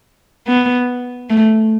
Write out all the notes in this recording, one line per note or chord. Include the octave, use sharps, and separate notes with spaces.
B3
A3